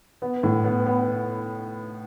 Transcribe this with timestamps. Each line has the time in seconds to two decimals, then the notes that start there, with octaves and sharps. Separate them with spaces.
0.22 B3
0.43 A2
0.64 B3
0.86 B3